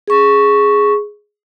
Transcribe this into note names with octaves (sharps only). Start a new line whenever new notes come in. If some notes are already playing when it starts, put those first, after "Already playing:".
G#4 C#6